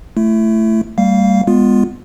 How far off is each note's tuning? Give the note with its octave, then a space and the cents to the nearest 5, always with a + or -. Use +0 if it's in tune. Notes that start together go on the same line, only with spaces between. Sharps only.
A3 +0 E4 +30
G3 +0 A#3 -45 F5 +0
G#3 -25 B3 +0 F4 +10